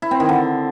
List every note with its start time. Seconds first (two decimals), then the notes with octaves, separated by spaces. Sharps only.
0.02 E4
0.11 C4
0.20 D#3
0.29 D3